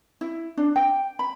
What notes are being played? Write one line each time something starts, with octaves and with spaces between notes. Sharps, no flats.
E4
D4
G5
B5